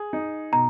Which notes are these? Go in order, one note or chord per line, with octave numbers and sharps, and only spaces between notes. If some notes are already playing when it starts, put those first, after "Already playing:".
Already playing: G#4
D#4
B2 A#5